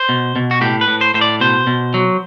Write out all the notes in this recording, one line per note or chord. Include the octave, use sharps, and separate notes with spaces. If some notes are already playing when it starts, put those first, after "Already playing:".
Already playing: C5
B2
B2
F#4
A2 G4
B4
A2
C5
A2 C5
D5
B2 C5
B2
F#3